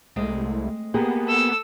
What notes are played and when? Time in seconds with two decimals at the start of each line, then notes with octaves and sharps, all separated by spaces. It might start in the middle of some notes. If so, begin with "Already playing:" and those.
0.16 C2 G#3 A3 C4
0.94 A#3 B3 G4 G#4
1.28 A4 E6